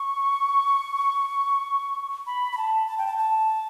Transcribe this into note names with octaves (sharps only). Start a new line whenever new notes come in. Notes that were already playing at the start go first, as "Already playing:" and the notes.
Already playing: C#6
B5
B5
A5
A5
G5
A5
A5